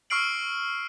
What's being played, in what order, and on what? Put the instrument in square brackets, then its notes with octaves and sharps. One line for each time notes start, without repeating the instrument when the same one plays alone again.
[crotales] C#6 E6 F6 C7 D7 F#7